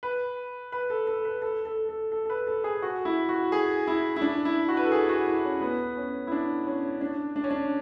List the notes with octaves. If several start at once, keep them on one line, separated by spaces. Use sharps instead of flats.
B4
B4
A4
A4
B4
A4
A4
A4
A4
A4
B4
A4
G#4
F#4
E4
F#4
G#4
E4
E4
D4
E4
F#4
B4
A4
G#4
F#4
E4
C#4
B3
C#4
E4
D4
C#4
D4
D4
C#4
D4